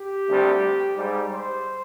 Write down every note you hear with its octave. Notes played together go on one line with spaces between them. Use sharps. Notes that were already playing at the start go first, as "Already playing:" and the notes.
Already playing: G4
D2 C3 G3
G#2 G3
C5